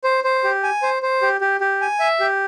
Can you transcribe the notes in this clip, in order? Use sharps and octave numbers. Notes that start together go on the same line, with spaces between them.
C5
C5
G4
G#5
C5
C5
G4
G4
G4
G#5
E5
G4